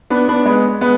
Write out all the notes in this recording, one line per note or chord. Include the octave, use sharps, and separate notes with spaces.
B3 D4
B3 D4
G#3 B3
G#3 B3